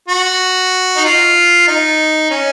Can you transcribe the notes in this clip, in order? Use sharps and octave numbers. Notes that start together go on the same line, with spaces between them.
F#4
D#4
F4
D#4
C#4